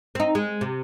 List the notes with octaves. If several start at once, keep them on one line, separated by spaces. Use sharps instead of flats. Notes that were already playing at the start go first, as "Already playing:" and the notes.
C4 D#4
G#3
C3